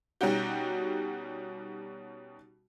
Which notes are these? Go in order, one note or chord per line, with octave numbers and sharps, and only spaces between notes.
B2 G3 C#4 D#4 F#4 G4